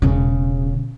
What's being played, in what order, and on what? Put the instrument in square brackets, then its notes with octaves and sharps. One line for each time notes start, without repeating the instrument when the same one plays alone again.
[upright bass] E1 C#3